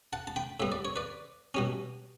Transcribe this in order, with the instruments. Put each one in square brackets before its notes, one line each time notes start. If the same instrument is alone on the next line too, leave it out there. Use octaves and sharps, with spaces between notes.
[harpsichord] F#5 A5
A5
G5 B5
A2 G3 B3 E5
D5
C#5
B4 D5
B2 G3 C#4